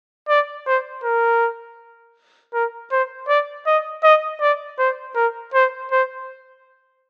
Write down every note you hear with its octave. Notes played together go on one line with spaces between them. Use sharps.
D5
C5
A#4
A#4
C5
D5
D#5
D#5
D5
C5
A#4
C5
C5